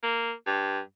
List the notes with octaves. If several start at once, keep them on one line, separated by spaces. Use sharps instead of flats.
A#3
G2